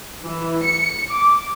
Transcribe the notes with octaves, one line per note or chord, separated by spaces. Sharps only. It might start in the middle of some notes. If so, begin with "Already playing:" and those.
E3
C#7
D6